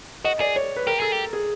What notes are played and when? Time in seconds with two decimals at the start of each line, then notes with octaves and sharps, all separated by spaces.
0.25 F#4 D#5
0.40 G#4 D5
0.56 C#5
0.76 B4
0.87 G4 A#4
1.00 G#4 A4
1.12 G4
1.33 G#4